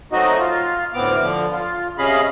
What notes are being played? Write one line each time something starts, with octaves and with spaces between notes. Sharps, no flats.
F#3 A3 C4 D#4 F#4 D#5
F4
D2 A2 B3 C4 D6 F6
D3 F3
F4
C3 C#4 G#4 D#5 F5 B5